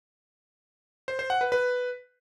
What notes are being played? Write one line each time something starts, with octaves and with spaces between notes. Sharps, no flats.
C5
C5
F#5
B4
B4